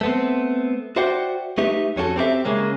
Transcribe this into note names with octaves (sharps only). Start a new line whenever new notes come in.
A3 B3 C4
F#4 C5 D5 E5 F#5 G5
A3 D#4 G4 B4 E5
F2 C#4 F#4 G4 A4
C4 G4 A#4 E5
C#3 G#3 A#3 C#4